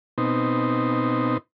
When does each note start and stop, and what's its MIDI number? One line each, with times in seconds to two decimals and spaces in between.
0.18 1.37 47
0.18 1.37 60
0.18 1.37 63